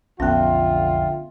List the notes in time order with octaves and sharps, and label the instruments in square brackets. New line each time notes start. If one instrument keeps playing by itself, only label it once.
[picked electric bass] B1 F2 [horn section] D3 F4 [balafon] B3 C#4 [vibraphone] E5 G5